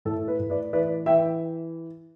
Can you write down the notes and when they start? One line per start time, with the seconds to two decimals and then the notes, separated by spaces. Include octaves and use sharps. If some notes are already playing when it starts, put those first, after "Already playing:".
0.05 A2 A4
0.28 B4
0.40 A2
0.50 B4 D5
0.73 E3 B4 D5
1.06 E3 E5 G5